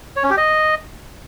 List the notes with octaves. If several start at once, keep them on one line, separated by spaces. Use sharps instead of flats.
C#5
C#4
G4
D#5